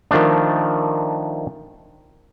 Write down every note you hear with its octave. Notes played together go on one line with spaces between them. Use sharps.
D#3 F3 A3 D4